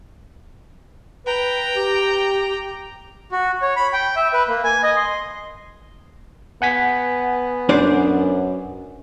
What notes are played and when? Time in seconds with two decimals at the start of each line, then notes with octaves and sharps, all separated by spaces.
1.27 B4 G5 A#5
1.76 G4
3.31 F#4
3.62 C#5
3.76 B5
3.93 G5
4.16 E5
4.34 B4
4.48 A#3
4.64 G#5
4.83 D#5
4.96 C6
6.62 B3 F#5 G#5 B6
7.69 F#2 D4 C5 D5